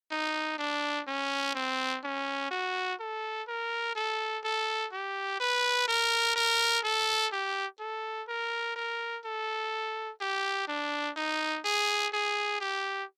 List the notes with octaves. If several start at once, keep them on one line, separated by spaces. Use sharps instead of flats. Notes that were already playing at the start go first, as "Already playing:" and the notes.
D#4
D4
C#4
C4
C#4
F#4
A4
A#4
A4
A4
G4
B4
A#4
A#4
A4
G4
A4
A#4
A#4
A4
G4
D4
D#4
G#4
G#4
G4